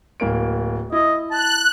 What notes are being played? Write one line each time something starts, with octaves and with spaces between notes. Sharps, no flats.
D1 A#3 D7
E4 D#5
A5 F#6